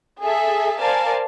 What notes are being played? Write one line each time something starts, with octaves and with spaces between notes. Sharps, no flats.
G#4 A4 E5
A#4 C5 D5 F5 G#5 A5